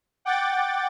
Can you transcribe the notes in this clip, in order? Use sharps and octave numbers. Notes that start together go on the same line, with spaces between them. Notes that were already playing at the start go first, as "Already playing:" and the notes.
F#5 G5 D6 A6